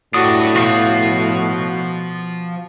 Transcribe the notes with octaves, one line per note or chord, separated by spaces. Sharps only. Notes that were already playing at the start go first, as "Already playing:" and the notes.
A2 D4 F#4 G4 B4 D#6
B2 F3 F#4 F5 D#6